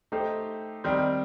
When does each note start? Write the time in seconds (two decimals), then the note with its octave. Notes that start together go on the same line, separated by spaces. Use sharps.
0.12 A3 D#4 G4 C5
0.84 D#3 G3 C4